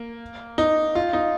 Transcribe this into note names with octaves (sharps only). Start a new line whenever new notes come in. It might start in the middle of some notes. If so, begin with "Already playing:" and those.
Already playing: A#3
D#4
F4
D#4